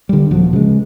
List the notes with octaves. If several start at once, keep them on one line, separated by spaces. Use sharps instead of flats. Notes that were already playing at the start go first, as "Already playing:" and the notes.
D3 G3
D#1 F3 F#3
C#3 G#3